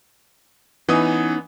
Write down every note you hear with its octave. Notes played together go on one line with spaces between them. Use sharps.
E3 B3 C#4 D#4 D#6